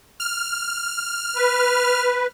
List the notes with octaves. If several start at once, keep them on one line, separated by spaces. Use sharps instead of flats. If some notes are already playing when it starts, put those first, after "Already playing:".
F6
B4